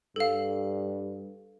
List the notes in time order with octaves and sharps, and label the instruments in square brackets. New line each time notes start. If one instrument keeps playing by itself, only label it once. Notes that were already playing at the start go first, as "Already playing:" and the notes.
[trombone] G2 [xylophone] A4 F5